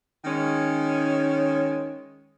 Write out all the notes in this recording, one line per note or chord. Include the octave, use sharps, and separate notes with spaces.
D#3 G#3 C#4